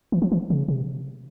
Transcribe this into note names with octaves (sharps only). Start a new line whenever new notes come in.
E3
F3
E3
C#3
C3